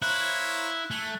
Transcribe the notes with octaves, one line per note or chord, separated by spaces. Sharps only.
A#3 E4 C5 C#5 F#6
A3 G#5